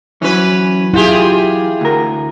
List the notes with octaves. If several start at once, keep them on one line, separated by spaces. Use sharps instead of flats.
E3 F#3 C#4 B4
E4 F4 G4 G#4
D2 A#4